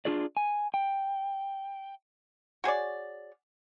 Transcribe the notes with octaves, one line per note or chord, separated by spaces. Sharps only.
D4 F4 G#4 D5
G#5
G5
F#4 G#4 C#5 D5